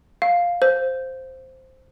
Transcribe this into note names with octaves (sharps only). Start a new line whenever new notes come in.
F5
C5